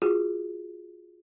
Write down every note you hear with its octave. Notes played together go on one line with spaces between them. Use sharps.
F4 F#4 G#4